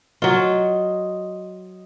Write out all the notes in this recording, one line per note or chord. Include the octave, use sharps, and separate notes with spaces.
F#3 F4 D#5